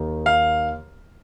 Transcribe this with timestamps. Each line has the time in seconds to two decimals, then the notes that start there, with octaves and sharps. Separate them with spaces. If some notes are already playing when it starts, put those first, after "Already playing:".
Already playing: D#2 D#3
0.26 F5